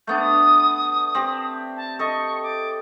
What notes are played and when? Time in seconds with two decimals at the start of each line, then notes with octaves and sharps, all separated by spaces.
0.07 A3 B3 D4 G6
0.19 D#6
1.15 C4 G4
1.77 A5
1.99 A4 D#5 C#6
2.43 D6